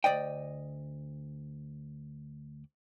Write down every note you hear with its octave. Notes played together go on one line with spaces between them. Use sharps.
D2 D5 D#5 G5